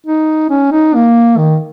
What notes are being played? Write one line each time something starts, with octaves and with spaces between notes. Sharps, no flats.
D#4
C#4
D#4
A#3
D#3